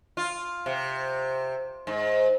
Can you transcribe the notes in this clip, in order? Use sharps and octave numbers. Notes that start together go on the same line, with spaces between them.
F4
C3
G#2